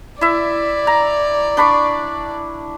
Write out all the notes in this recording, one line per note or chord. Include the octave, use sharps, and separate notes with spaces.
E4 D5 E5
A#5
D4 B5 C#6